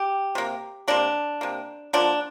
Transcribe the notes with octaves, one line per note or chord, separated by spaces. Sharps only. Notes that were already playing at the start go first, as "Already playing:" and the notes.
Already playing: G4
C3 A#3
C3 A#3 D4
C3 A#3
D3 F3 A#3 D4